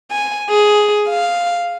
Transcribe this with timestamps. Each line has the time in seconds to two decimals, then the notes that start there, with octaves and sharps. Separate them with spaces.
0.11 G#5
0.50 G#4
1.09 F5